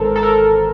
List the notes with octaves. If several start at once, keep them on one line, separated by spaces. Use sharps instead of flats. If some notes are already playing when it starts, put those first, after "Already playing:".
Already playing: G#1 G#2 E3 A4 A#4 C5
A4
A#4